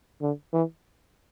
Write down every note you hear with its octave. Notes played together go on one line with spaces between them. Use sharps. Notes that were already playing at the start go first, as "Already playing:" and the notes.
D3
E3